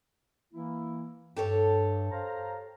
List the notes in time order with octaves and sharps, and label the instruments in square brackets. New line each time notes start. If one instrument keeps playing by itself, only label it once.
[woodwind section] E3 A#3 E4
[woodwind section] G2 [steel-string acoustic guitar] G4 A4 C#5
[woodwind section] C5 F5 A#5